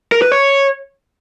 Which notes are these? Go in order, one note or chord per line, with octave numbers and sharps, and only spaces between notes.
A#4
B4
C#5